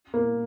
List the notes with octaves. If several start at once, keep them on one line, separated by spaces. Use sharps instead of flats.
A#3